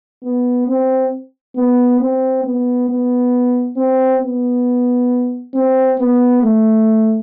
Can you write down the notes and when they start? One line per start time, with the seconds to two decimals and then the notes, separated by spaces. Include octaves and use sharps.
0.23 B3
0.68 C4
1.56 B3
2.00 C4
2.45 B3
2.89 B3
3.77 C4
4.22 B3
5.54 C4
5.99 B3
6.43 A3